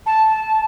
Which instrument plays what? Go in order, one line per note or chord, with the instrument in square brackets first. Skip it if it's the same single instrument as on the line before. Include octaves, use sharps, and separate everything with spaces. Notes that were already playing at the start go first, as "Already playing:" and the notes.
[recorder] A5